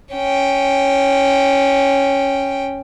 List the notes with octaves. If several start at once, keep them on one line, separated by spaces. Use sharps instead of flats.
C#4 G5